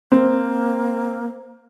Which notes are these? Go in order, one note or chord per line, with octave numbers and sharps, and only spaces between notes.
A#3 C4